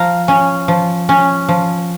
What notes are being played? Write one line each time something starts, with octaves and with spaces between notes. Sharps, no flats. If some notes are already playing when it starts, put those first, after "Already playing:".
Already playing: F3 F5 A#5
C#4
F3
C#4
F3